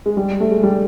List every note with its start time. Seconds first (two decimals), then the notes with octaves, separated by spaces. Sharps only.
0.06 G#3
0.17 G3
0.40 A3
0.52 G#3
0.63 G3